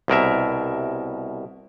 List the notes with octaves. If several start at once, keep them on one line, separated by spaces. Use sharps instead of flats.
C2 B2 A#4 E5